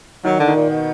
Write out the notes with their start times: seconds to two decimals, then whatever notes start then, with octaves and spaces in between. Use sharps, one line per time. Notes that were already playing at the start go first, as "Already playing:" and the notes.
0.25 D#3 F#3
0.40 D3
0.48 D#3
0.55 A#2
0.70 B2